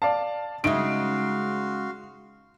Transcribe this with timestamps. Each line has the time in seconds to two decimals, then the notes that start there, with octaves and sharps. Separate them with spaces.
0.02 D5 F5 A5
0.64 C#3 G#3 D#4 F#4 E5 F5 C6 D7